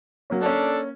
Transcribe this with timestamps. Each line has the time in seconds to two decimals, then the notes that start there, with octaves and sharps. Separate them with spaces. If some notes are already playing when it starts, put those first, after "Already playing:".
0.30 F#3 A#3 C#4
0.42 A#3 C#4 D4 A4